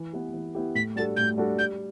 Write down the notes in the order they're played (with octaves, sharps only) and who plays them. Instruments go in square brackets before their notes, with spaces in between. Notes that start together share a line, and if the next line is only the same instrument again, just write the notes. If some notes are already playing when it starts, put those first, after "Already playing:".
Already playing: [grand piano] E3
B3 E4 G4
E3
B3 E4 G4
[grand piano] A2 [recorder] B6
[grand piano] G3 D4 F#4 A4 [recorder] A6
[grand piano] A2 [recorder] G6
[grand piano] G3 D4 F#4 A4
[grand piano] G3 [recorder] G6